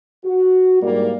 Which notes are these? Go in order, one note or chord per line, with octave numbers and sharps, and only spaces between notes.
F#4
G#2 G3 A#3 E4 D5